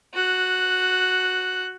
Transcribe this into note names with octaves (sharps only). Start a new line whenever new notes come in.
F#4 F#6